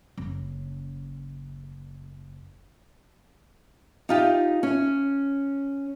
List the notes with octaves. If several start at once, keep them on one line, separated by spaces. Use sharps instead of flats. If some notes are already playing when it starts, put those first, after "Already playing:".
F#1 C#3
D#4 F4 G4
C#4